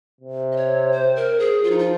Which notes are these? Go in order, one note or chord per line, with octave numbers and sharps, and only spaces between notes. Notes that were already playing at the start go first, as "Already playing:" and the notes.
C3
D#5
C#5
C5
A#4
G#4
F3 F4
D#4
F4